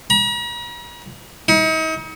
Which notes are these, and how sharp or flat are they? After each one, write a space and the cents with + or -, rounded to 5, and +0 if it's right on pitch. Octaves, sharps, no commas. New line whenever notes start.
A#5 +45
D#4 +40